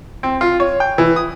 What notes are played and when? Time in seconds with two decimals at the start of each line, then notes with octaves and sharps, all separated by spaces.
0.23 C4
0.41 F4
0.60 C#5
0.80 G5
0.98 E3
1.16 D#6